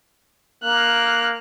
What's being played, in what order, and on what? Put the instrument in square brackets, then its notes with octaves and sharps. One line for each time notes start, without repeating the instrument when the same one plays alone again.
[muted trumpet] A#3 [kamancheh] F6 F#6